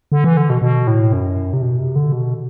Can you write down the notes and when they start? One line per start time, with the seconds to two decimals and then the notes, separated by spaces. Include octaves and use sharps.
0.12 D3
0.24 E3
0.37 D3
0.50 B2
0.62 B2
0.87 A2
1.13 F#2
1.53 C3
1.62 B2
1.79 C3
1.96 D3
2.12 B2